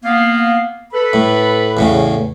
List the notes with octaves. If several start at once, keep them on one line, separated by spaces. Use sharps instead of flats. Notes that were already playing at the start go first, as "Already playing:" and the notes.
A#3 B3 F5
A4 B4 B5
A2
E2 A2 C#3